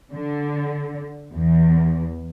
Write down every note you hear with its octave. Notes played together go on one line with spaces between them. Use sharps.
D3
E2